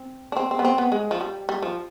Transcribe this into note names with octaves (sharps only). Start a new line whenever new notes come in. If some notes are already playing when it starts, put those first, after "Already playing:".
Already playing: C4
D4
C4
C4
B3
C4
B3
G#3
F3
G3
G3
F3